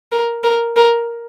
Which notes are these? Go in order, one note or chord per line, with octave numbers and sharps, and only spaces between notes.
A#4
A#4
A#4